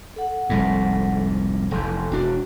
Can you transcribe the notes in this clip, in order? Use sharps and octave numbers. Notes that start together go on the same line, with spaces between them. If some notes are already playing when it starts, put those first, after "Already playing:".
A4 F#5
F1 C2 G#2
F1 E2 A4 C6
E1 D4 F#4